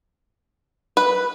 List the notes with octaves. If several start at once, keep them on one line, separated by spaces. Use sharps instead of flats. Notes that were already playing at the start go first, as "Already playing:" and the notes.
B4